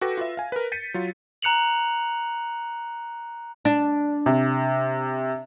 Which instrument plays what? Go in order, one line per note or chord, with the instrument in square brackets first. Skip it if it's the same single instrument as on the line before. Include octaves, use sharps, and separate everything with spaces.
[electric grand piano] F#4 A4 B4 G5 D6 A#6
F4 B4 E5
F5 G#5
A#4 B4
G6 A6 B6 C#7 D#7
F#3 F4
[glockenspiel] A#5 F#6 C#7 F7 F#7
[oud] D4
[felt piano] C3